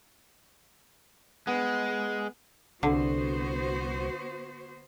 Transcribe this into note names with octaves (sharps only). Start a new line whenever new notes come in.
G#3 B3
C2 D3 B3 F#4 C5